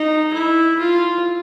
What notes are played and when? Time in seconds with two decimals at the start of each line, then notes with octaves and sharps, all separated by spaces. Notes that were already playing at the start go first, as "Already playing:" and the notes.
Already playing: D#4
0.33 E4
0.79 F4